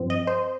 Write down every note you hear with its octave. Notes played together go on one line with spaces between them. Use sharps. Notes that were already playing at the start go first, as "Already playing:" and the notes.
Already playing: G2 F3 C4
D#5
C5